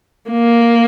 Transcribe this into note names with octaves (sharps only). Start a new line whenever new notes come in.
A#3